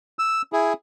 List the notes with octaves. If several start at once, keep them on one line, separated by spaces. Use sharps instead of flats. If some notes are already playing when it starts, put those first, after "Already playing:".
E6
E4 G#4